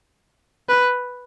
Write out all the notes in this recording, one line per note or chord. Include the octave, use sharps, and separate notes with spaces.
B4